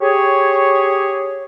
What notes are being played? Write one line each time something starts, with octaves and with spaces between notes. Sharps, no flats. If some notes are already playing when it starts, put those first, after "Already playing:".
G4 G#4 C#5